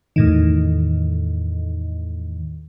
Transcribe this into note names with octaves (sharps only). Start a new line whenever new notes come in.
E2 A2 D#3